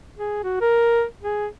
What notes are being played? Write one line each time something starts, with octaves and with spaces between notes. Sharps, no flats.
G#4
F#4
A#4
G#4